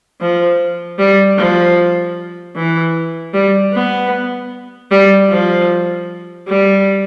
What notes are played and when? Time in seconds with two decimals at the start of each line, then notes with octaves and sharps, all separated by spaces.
0.21 F3
0.99 G3
1.38 F3
2.56 E3
3.34 G3
3.73 B3
4.91 G3
5.29 F3
6.48 G3